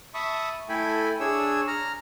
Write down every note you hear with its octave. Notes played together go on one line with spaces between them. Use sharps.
E5 A5 B5 C#6 D#6
A3 E4 A4 G5 G#5 B5
D4 G#4 C#5 E6
A#5 F6